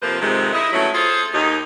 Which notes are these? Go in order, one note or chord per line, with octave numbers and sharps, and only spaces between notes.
F2 C3 F3 A#3 B4 C5
F2 C3 D#3 F3 G#3
E4 D#5
F3 F#3 A3 B3 C#4 E4
F4 G#4 A4 C5
D#2 D#4